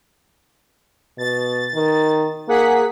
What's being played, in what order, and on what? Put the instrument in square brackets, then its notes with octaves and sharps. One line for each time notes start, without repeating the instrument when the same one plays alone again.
[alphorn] B2 [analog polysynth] A6
[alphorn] D#3
[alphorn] A#3 [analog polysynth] G#4 F#5 B6